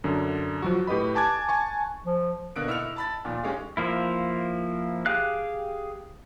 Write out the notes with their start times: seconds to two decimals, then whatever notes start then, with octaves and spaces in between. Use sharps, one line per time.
0.04 F#2 D3
0.62 F3 F#3 F#4
0.87 A2 G4 B4 D#5 B5
1.15 G#5 A5 D6 F#6 G#6
1.49 G#5 A5 C#6
2.05 F3
2.56 B2 D3 A#3 F#6 D7
2.67 D#4 E4 E6 F6 C#7 F7
2.96 A5 B5 A6
3.24 D#2 A#2 F3
3.43 G#3 C#4 D#4 G4 F5
3.77 F3 A#3 E4
5.06 G4 G#4 F5 F#6